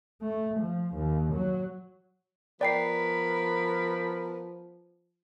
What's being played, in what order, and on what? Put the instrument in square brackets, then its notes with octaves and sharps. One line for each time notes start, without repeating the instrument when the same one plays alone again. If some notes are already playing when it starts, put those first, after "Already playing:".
[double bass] A3
F3
D#2
F#3
[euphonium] F3 [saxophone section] B3 A#4 [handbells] D5 G5 C7 [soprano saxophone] B5